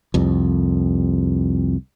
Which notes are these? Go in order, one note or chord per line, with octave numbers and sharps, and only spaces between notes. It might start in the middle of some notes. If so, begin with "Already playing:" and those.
C2 F2